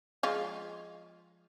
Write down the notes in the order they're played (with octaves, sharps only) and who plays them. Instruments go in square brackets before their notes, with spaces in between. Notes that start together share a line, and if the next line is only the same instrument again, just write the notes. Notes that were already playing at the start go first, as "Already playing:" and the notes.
[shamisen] F3 G#3 F4